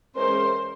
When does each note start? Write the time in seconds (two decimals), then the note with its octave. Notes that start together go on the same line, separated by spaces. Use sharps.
0.15 E3 G#3 C#4 A#4 C5